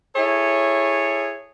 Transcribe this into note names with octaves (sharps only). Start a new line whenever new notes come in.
E4 G#4 A4 C#5